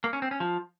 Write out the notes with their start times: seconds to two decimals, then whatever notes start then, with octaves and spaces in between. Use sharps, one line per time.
0.04 A#3
0.13 C#4
0.22 C4
0.31 C#4
0.40 F3